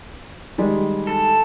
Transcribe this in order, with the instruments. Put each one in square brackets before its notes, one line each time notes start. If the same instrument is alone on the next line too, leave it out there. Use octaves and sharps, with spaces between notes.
[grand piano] D#3 G3 G#3
[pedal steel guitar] A4